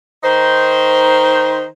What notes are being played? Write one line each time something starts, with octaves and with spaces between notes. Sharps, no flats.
D#3 D#4 C5